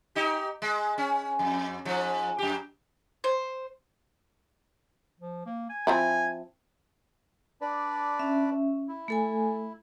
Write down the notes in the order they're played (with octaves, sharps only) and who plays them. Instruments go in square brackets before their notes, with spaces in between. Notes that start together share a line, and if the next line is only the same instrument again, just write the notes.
[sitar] D#4 G4
G#3
C#4
F2
G#2 F3
F#2 G4
[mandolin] C5
[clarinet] F3
A#3
G#5
[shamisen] F3 C4 E4 [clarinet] G#5
[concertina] D4 B4 D5
[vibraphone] C#4 E5
[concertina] E4
[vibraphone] A3 A4 G#5